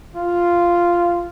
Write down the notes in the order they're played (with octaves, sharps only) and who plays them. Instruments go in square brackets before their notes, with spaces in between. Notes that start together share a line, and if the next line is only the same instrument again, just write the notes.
[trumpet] F4